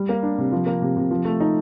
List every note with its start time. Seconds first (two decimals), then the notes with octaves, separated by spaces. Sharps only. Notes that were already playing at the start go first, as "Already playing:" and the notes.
Already playing: G3
0.09 A#3
0.23 D4
0.38 C3
0.52 F3
0.66 A#3
0.82 C3
0.97 C3
1.11 F3
1.25 A3
1.40 D#4